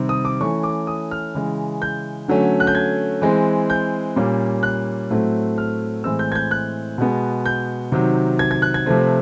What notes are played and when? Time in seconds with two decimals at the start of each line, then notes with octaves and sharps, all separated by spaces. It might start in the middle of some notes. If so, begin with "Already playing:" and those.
Already playing: C3 D#3 G3 C4
0.09 D#6
0.25 D6
0.40 E3 A3 C#4 C#6
0.63 D6
0.87 D#6
1.11 F6
1.35 C#3 E3 G#3
1.82 G6
2.28 D3 F#3 A3 C#4
2.60 F#6
2.67 G6
2.75 G#6
3.22 E3 G#3 C4
3.70 G6
4.16 A#2 G3 A#3 C#4
4.63 F#6
5.11 A2 F#3 A3 C4
5.58 F6
6.04 A2 E3 G#3 C4 E6
6.19 G6
6.32 G#6
6.35 G6
6.51 F#6
6.98 B2 G#3 B3
7.46 G6
7.92 C3 D#3 F#3
8.39 G#6
8.51 G#6
8.62 F#6
8.74 G#6
8.86 C3 F3 A3 C4